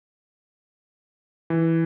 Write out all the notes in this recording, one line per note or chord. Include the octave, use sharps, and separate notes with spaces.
E3